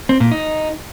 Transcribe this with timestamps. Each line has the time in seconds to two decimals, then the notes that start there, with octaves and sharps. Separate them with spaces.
0.09 C4
0.20 A#2
0.32 D#4